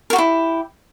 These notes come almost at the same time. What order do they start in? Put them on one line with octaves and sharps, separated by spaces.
A#4 F#4 G4 E4